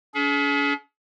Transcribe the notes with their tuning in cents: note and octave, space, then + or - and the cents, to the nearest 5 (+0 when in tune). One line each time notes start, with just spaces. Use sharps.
C#4 +45 G#4 +40